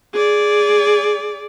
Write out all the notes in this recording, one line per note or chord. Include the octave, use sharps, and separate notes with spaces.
G#4 D5